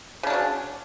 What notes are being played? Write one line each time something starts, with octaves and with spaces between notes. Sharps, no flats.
C#3 F#3 C#4 D4